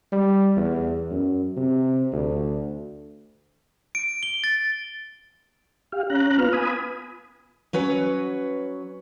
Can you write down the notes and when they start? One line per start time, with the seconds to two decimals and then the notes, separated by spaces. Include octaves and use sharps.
0.12 G3
0.56 E2
1.11 F#2
1.56 C3
2.12 D2
3.95 D7
4.23 G7
4.44 A6
5.92 G4 F5
6.10 C#4 A#5 F#6
6.38 B3 F4 B4 F6
6.53 G#5 B5 D#6
7.73 F#3 C#4 B4 C#5